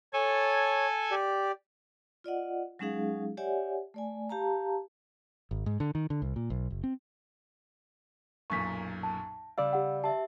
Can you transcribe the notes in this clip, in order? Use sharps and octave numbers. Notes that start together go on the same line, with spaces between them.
A4 C#5 G#5
G4 D5
F4 D5 D#5 F#5
F#3 G#3 C#4 D#4 G#4 F5
G4 C#5 D5 E5 F#5 G#5
A3 D5 G#5
G4 F5 A5 A#5
G#1
G#2
D3
D#3
D3
C2
A#2
B1
F#1
C4
B1 F#2 A#2 C#6 B6
A5
C#3 G3 D5 F5 E6
G4 F#5
G4 E5 A5